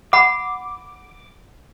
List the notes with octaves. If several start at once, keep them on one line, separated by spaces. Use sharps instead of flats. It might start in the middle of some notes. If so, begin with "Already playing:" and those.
F#5 B5 D6